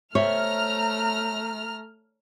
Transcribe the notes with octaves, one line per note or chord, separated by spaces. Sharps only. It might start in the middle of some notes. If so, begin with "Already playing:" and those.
A3 C5 C#5 E5 A#5 F6